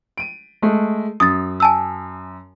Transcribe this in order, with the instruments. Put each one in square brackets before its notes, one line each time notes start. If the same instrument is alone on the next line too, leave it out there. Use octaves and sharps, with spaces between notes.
[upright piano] D7 D#7
G#3 A3
[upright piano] F#2 [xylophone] D#6 A6
[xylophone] G#5 A5 E6